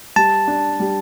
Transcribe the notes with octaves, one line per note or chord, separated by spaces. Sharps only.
G3 A5
D4
G3